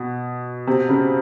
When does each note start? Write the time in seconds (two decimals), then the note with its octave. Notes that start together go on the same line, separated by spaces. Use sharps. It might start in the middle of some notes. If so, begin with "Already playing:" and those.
Already playing: B2
0.67 C3
0.89 C#3